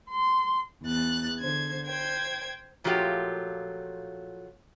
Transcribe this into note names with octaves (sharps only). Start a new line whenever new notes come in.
C6
E2 F#6 A6
D3 C5 G#6
C5 G5 G#6
A#2 F3 F#3 A3 F4 G4